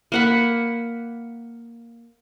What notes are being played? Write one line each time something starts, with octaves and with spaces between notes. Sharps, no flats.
A#3 F#5 B5